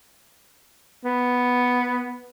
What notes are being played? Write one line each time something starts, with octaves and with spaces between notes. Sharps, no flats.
B3